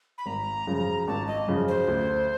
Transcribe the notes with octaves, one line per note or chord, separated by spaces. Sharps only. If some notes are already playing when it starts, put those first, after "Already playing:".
B5
G#1 A#5
F#2 C#3 F3
G#1 A5
D#5
F#2 C#3 F3
C5
D2